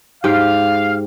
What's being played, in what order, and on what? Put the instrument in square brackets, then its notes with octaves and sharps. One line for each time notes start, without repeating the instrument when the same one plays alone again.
[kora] G#2 G4 [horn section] F5